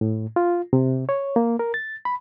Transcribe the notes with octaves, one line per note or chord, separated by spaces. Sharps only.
A2
F4
C3
C#5
A#3
A#4
A6
B5